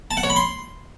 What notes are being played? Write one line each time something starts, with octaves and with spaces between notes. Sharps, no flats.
A5
F#5
C#5
B5
C6